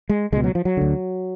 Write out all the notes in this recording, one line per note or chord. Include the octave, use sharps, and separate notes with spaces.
G#3
C#2 B2 G#3
F#3
F3
F#3
D2 D3